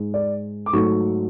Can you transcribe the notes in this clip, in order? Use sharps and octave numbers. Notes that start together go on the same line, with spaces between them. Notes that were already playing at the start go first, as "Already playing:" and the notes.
Already playing: G#2 G#3
D5
D6
G#2 F#3 A3 C#6